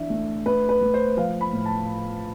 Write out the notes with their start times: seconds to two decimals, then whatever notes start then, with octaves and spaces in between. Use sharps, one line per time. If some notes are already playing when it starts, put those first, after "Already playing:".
Already playing: E3 D4 E5
0.10 A3
0.46 A3 B4
0.69 B4
0.81 A3
0.94 C5
1.17 F3 F5
1.41 B5
1.53 A2
1.66 A5